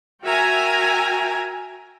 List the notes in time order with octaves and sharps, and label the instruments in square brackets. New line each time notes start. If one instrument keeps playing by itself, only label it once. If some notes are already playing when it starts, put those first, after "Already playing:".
[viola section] F#4 A#4 E5 G5 G#5 A#5